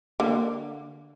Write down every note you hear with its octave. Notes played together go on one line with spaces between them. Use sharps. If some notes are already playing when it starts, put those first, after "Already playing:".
D3 A#3